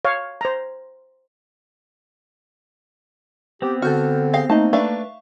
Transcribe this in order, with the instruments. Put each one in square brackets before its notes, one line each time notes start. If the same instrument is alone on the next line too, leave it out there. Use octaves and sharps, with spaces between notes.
[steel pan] C#5 F5
C5 A#5
[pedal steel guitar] B3 C4 [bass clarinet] G4
[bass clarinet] D3 [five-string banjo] F#4 A4 [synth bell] F6 G6
[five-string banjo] G4 G#4 F5 [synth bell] A#6 C7
[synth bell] A3 D#4 D#5 [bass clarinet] A#3 [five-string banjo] A5
[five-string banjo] A3 D4 B4 [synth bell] E5 F5 C#6